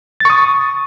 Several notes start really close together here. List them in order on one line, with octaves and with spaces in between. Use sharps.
A6 C#6 D#6